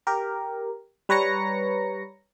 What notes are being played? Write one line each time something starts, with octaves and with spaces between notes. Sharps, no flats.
G4 A#4
G3 B4 C#5 A#5 A#6 C#7